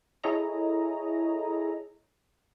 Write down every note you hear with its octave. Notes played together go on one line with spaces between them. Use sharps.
E4 G#4 A4 C#5 D#5 A#5